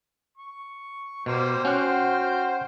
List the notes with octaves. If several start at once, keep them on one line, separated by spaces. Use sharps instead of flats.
C#6
B2 G3 A#3 C5
C#4 F#4 F#5 G5 F6